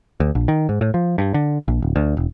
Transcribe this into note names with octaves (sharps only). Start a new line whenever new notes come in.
D2
A#1
D#3
G#2
A2
F3
G2
D3
A#1
D1
D2
E1